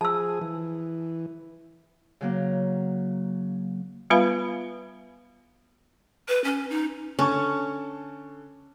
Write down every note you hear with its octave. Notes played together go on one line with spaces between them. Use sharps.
F3 G#4 A5 E6
E3
C#3 F#3 A#3
G3 B3 F4 B4 F5 B5
B4
C#4
D#4
D3 C#4 A5 C#6